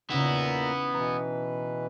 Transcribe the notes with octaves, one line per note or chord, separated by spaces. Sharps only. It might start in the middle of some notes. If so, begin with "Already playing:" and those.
A#2 C#3 B3 C#4 D#4 E4 A#5
B2 E3 B4 A#5